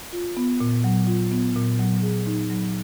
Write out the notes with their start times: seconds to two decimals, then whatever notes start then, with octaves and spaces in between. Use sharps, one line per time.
0.13 F4
0.37 B3
0.60 A#2
0.84 F#3
1.07 F4
1.32 B3
1.55 A#2
1.79 F#3
2.02 G#4
2.26 D#4
2.50 F#3